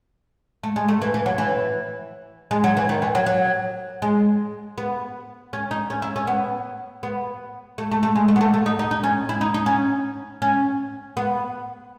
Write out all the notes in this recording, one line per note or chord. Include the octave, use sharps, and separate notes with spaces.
A3
G#3
A3
E3
E3
F#3
E3
G#3
F#3
E3
D#3
E3
F#3
F#3
G#3
B3
C#4
D#4
C#4
E4
C#4
B3
B3
A3
A3
A3
G#3
A3
B3
A3
A3
D#4
D#4
D#4
C#4
E4
D#4
D#4
C#4
C#4
B3